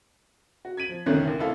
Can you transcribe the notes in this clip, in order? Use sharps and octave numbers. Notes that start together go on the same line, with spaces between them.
F#4
G#6 B6 D#7 F#7
F3
F1 C2 D3 D#3 C#4 F#6
D#2 E3
A1 C3 E4 A4 F5